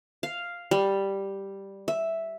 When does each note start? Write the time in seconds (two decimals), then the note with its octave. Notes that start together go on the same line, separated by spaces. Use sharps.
0.23 F5
0.71 G3
1.88 E5